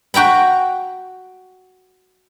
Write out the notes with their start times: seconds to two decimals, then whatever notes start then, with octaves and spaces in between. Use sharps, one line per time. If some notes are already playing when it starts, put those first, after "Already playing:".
0.14 F#4 G5 A#5 B5